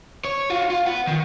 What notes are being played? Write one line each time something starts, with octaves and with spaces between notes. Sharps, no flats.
C#5
F4 F#4
F4
B3 F#5
D#3